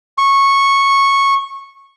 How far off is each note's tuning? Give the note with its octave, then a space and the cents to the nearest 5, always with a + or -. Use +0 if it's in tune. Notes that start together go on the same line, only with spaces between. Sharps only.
C#6 -10